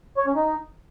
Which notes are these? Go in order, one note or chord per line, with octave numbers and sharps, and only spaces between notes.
C#5
C#4
D#4